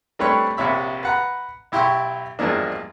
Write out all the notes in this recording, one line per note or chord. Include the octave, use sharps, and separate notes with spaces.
G3 A3 C4 D4 B4 C#5
A#1 C3 C#5 E5 B5
B4 F#5 A#5
B1 E4 G4 G5 C6 C#6
E2 G2 F3 G#3 A#3 D4